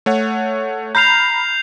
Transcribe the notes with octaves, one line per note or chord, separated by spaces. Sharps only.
A3 C#5 F#5
A#5 B5 F6 G6 C7 F7